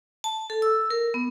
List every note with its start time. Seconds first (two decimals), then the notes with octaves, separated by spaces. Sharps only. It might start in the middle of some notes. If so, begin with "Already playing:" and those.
0.24 A5
0.50 A4
0.62 E6
0.90 A#4
1.14 B3